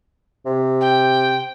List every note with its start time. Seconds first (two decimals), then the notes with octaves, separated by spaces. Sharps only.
0.46 C3
0.81 G5